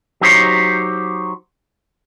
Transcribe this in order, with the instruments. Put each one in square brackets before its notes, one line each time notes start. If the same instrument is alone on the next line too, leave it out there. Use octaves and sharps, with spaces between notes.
[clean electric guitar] F#3 D#4 G4 C5 C#5